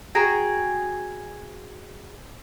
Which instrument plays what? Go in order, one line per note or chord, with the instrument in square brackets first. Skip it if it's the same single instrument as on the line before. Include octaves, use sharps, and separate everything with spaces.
[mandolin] F#4 G#4 G5 A#5